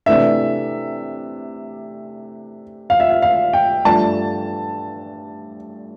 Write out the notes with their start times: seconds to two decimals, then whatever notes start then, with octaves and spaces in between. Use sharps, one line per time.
0.06 C3 E3 A3 D4 E5
2.90 F5
3.00 E5
3.10 F5
3.22 F5
3.53 G5
3.85 G2 F3 A3 D4 A5